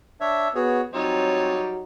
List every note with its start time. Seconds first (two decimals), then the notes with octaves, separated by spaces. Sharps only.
0.21 D4 C#5 E5
0.55 B3 F#4 G#4 C#5
0.94 F#3 G3 C4 D#4 F4 C#5